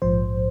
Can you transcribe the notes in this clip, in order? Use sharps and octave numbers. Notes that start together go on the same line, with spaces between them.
A#1 G#2 F3 C5